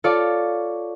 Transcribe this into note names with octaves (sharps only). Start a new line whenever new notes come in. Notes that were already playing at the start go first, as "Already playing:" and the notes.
F4 A4 C#5 D5